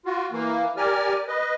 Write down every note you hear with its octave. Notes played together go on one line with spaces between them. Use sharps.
F4 F#4
E3 A#3
G4 A#4 D5 G#5 F6
B4 D#5